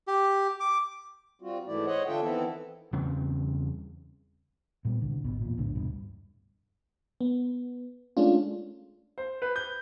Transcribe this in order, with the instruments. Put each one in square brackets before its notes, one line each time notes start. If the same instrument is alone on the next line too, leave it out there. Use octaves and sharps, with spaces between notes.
[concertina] G4
D6
[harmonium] G3 C4 F4 F#4
G#2 E3 A3 E4 D5
C5 C#5 D#5 F#5
D3 D4 F4 A4 E5 G5
D#3 E3 B3 C4 E4 A4
[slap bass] E2 C#3 G3 C4
[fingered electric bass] A#2 G3 B3
C2 D3
G#1 B2
E2 A#2
E1 B1 A2 D3
D#1 C2 G2 B2
[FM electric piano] B3
G#3 A3 C#4 D4 F4
[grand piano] C5
B4
G6